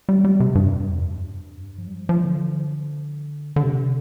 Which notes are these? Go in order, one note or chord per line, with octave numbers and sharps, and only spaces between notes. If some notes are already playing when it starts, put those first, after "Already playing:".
G3
G3
C3
G2
F2
E2
F2
G2
F3
G3
F3
F3
D3
D3
C3